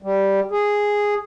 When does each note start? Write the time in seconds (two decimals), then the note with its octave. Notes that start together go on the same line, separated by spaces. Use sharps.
0.02 G3
0.51 G#4